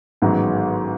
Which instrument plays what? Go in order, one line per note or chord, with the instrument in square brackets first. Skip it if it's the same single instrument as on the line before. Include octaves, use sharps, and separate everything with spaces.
[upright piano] A1 G#2 D#3 F#3 B3